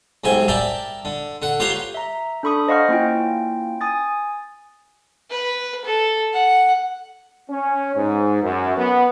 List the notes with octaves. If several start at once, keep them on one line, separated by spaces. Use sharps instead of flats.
B1 G#2 C3 E5 G#5
A#4 D5 E5 G5 A5 B5
D3
D3 F#5
F4 G4 B4 C#5 A#5 C6
E5 A#5
D4 A4 B5 C#6 D#6
C5 D#5 F5 F#5 C#6 F6
A#3 C#4 E4 F4 G5
G#5 D#6 A6
B4
A4
F#5
C#4
G#2
F#2
B3